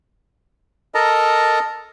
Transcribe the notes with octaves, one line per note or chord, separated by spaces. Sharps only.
A4 A#4 D#5 A5 A#5